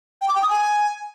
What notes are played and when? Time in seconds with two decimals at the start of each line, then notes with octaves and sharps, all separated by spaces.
0.21 G5
0.28 D6
0.35 G5
0.43 D#6
0.50 G#5